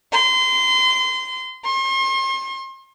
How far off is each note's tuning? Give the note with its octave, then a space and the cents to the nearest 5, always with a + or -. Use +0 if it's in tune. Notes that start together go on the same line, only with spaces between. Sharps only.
C6 -25
C6 +40